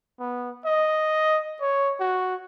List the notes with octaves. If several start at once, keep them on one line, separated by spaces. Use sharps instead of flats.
B3
D#5
C#5
F#4